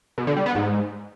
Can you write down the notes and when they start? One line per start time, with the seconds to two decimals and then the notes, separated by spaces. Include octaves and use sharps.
0.18 B2
0.27 D3
0.36 G3
0.46 B3
0.55 G#2